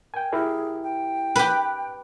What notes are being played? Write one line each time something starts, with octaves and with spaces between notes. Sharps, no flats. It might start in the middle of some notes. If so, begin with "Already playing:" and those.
A#4 G5 G#5
E4 G4 G#4 A#4
G5
G4 B4 F#6